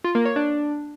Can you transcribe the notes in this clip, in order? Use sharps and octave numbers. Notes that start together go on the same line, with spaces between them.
F4
A#3
C#5
D4